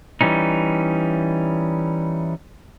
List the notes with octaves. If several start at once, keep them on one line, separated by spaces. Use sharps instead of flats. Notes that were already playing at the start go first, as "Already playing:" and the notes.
E3 G3 C#4 D#4